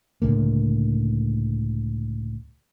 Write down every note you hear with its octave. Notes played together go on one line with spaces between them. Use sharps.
C#2 A2 D3 A#3